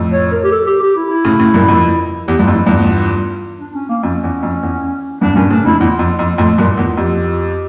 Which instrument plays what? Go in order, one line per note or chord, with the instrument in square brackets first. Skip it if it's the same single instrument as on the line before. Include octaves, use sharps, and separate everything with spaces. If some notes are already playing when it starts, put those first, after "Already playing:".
Already playing: [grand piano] F2 A2
[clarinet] C#5
A#4
G4
A4
G4
G4
E4
E4
[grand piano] A2 C#3
A2 C#3
G2 A#2
F2
[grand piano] E2 [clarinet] G4
[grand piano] G2 [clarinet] F4
[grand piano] F2
[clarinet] E4
[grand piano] E2 G2 [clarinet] F4
[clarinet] D4
C#4
A#3
[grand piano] F2 [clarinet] C#4
[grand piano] E2
F2
E2
[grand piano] E2 G2 [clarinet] D4
[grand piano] G2 A#2 [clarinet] C#4
[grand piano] A2 C#3 [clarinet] D4
[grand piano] F2 A2 [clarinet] E4
[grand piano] E2 [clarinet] F4
[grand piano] F2
F2
F2 A2
G2 A#2
E2
[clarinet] F4
[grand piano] F2 [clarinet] G4